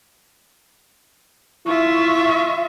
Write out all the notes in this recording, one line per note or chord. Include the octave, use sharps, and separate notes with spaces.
E4 F4 E5 C#6